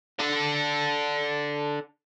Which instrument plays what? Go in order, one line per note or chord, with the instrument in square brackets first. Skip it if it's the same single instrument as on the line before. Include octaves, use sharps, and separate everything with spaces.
[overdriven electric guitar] D4 A4